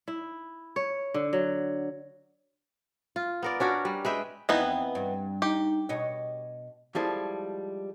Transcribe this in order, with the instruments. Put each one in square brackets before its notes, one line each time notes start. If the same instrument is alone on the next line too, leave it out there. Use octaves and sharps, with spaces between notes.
[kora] E4
C#5
D3
F#3
F4
B3 A#4 D5
C#4 D4 F#4 A#4
G3
G#3 B4 E5 G5
[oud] F2 [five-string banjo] E3 B3 D#4
[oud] G2
[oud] D#4 [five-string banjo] G4
[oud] B2 C#5 D#5
[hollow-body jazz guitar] F3 G3 G#3 E4 A4 C5